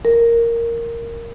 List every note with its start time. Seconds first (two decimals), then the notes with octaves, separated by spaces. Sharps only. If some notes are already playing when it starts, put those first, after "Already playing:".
0.05 A#4